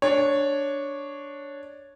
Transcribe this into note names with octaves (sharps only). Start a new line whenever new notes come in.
D4 C#5